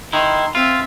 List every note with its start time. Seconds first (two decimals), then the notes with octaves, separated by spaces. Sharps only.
0.13 D#3 D#4 E4 C6
0.55 C4 F4 E5